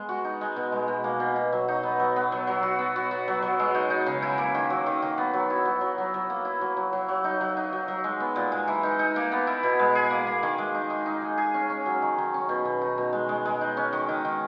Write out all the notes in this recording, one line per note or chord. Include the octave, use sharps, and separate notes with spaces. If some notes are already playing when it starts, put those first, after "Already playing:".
Already playing: G#3 B3
F#4
D#4
G#3
B2
G#3
B2
A#3
B2
B2
F#3
D#4
B3
F#3
B3
F#3
F#3
F#4
B3
F#4
B3
F#3
F#3
G#3
D#4
D#4
C#3
E4
A#3
D#3
F#3
D#3
D#3
B3
F#3
E4
F#3
F#3
F#3
F#3
A#3
E4
F#3
F#3
F#3
F#3
D#4
F#3
D#4
F#3
F#3
G#3
B3
A#2
G#3
E3
D#4
D#4
A#3
B3
E4
B2
G#3
G#4
A#3
A#3
D#3
G#3
D#4
D#4
D#4
G#4
G#4
C#4
C#4
F#3
D#3
D#3
C#4
B2
B2
D#4
B2
G#3
G#3
G#3
D#4
C#4
D#3
D#3
D#3